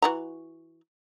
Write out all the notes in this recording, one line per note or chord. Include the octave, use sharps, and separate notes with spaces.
E3 F#4 A#5